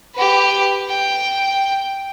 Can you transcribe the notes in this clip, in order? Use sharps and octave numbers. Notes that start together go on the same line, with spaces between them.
G4 B4
G5